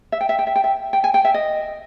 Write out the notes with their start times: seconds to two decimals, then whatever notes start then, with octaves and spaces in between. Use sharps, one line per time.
0.12 E5
0.21 G5
0.29 E5
0.39 G5
0.47 E5
0.56 G5
0.64 E5
0.93 G5
1.04 G#5
1.14 G5
1.25 E5
1.34 D#5